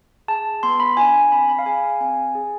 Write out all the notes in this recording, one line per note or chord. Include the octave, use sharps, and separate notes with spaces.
G#4 A5
B3 C6
B5
D4 F4 G#5
G#5
C4 B5
B5
F5
G#4 G#5
F5
C4 G#5
G#4